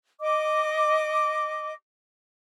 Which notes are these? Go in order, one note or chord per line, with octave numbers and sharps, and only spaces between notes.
D#5 D6